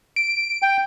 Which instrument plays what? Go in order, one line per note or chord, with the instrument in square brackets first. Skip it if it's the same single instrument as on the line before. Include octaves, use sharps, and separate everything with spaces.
[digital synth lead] D7
[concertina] G5